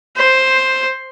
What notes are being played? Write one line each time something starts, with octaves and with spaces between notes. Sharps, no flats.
C5